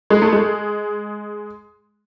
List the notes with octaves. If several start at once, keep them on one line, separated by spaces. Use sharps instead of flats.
G#3
A3
G#3